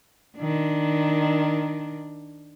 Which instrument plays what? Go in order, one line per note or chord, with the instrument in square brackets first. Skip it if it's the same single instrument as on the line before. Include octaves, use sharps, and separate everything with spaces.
[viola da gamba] D#3 D4